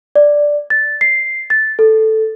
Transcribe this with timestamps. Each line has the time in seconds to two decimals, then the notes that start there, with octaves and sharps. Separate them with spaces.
0.16 D5
0.70 A6
1.01 C7
1.50 A6
1.79 A4